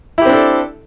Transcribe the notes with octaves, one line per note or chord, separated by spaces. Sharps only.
C4 D4 E4 G4 A4